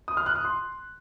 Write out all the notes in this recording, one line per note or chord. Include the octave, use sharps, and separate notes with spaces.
D#6
F6
F#6
D#6
C6